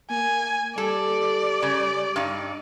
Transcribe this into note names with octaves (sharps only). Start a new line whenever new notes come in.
A#3 G#5
G3 A4 D5
C#3
G2 D#4